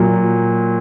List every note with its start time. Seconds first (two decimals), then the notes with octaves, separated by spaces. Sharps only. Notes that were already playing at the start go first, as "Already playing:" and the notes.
Already playing: A#2 F#3